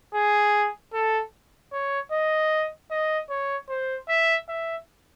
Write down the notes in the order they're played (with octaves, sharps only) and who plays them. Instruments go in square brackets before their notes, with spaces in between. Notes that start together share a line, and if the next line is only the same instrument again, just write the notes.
[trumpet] G#4
A4
C#5
D#5
D#5
C#5
C5
E5
E5